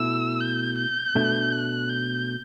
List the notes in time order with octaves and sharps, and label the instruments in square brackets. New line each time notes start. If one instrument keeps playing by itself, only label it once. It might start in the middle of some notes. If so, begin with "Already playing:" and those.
Already playing: [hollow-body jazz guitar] B2 A3 E4 [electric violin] E6
[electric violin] G6
G6
[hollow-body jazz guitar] B2 A3 D4
[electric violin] F#6
G6